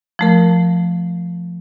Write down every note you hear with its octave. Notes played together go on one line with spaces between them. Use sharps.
F3 A3 A#4